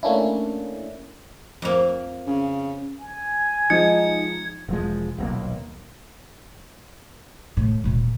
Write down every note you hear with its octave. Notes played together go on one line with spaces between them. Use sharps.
A3 A#3 C#4 D4 E4
F2 A#3
C#3
G#5
F3 G#3 D#4 G#6 C#7
E1 F3 G#3
D#1 B1 A#3
A2
D#1 A#2